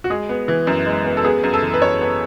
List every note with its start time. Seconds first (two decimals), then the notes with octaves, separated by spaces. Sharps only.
0.04 F#4
0.10 G#3 G#4
0.29 B3
0.48 E3
0.67 F#2
0.86 G#3
1.06 B3
1.17 A4
1.24 B3 G#4
1.43 F#2
1.54 A4
1.62 E3
1.74 B4
1.82 F#2 C#5
2.01 B3